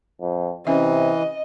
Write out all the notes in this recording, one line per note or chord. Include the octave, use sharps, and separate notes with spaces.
F2
C3 E3 C#4 D#5 E5